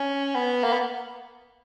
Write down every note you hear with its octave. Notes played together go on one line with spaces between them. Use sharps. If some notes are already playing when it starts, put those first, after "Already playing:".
Already playing: C#4
B3
A#3
B3